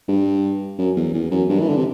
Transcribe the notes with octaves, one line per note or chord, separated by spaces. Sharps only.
G2
F#2
E2
E2
F#2
G2
E3
D3
C3